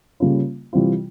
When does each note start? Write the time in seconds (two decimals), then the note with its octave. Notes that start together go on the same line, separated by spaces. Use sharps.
0.20 C#3 G3 A#3 C#4 F4
0.73 C3 E3 G3 C4 F4